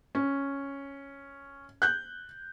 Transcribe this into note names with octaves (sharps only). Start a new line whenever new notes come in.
C#4
F#6 G6